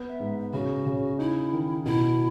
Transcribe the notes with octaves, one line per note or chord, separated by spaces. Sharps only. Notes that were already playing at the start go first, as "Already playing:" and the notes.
Already playing: B3
E5
G#2
C#3 F#4
C#3
D#4 E4
D#3
B2 E4